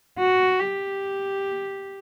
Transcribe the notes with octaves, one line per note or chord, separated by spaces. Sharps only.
F#4
G4